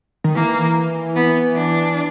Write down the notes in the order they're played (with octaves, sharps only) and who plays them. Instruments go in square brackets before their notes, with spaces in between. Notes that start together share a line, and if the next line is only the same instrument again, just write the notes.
[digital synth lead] D#3
[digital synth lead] E3 [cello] A#3
[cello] B3
D4